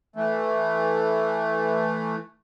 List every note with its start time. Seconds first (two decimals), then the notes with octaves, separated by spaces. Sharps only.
0.16 E3 A3